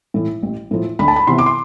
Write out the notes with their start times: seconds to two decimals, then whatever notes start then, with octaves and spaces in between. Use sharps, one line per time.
0.14 A2 E3
0.43 A1
0.71 A2 F3
0.99 D2 B5
1.08 A5
1.16 B5
1.27 C3 E3 B3 E4 C6
1.38 D6
1.46 C6